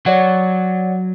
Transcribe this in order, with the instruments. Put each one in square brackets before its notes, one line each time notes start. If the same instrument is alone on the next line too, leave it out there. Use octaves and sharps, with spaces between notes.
[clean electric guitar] F#3 [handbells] C#5 D5 F#5